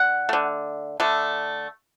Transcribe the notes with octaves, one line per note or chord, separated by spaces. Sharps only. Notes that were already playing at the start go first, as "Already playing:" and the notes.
Already playing: D3 F#5
D3 A3
D3 A3